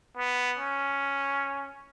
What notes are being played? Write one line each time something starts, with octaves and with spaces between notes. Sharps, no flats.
B3
C#4